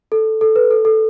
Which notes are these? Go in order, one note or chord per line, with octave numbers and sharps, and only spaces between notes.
A4
A4
B4
A4
A4